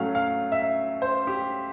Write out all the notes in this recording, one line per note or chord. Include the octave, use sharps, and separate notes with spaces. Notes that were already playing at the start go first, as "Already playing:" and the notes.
Already playing: A2 F#3 A3 C#4 F5
F5
E5
C5
G4